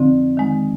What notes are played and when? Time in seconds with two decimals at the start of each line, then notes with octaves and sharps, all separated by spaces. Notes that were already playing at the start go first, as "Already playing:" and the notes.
Already playing: F2 D3 F3 C4 D#4
0.37 D#3 G#3 D#4